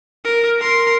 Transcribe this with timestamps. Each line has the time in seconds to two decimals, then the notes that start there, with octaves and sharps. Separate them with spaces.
0.24 A#4
0.58 A#4 C6